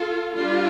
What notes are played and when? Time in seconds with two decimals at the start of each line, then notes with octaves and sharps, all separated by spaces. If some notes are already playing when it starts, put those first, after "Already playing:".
Already playing: F4 A4
0.35 G3 D4 F4